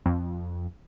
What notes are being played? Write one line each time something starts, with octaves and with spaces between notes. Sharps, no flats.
F2